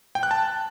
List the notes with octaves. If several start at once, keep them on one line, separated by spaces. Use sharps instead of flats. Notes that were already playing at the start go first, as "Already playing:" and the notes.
G5
F#6
A5